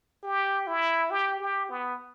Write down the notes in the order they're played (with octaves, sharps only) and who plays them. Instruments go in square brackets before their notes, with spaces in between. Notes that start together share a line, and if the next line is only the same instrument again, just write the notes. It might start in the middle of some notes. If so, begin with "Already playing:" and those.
[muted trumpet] G4
E4
G4
G4
B3